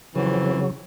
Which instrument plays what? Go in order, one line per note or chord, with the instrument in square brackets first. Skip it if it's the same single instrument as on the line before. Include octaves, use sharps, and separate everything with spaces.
[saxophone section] F2 E3 C4 [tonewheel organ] C#3 F#3